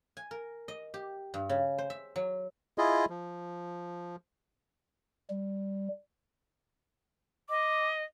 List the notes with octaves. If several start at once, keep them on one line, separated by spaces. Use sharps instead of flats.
G#5
A#4
D#5
G4
G2
C#3
C5
E5
F#3
E4 F4 G#4 D#5
F3
G3
D#5 D6